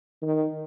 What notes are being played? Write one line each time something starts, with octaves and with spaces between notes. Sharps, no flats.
D#3